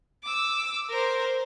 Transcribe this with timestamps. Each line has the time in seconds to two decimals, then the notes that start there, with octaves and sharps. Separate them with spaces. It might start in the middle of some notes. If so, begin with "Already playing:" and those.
0.24 D6 E6
0.90 A#4 C5